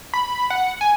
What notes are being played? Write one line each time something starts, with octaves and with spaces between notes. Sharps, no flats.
B5
F#5
G#5